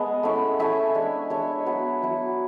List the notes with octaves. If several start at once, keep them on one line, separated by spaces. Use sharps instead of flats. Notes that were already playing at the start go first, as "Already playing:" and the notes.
Already playing: G#3 B3 F#5 A5
A3 C#4 E4
A3 C#4 E4 E5 G#5
G#3 D4
G#3 D4 C#5 E5
F#3 B3 E4
F#3 B3 E4